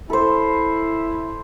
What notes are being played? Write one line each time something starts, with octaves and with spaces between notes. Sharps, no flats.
E4 A4 C5